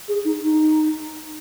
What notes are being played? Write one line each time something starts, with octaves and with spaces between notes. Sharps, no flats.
G#4
D#4
D#4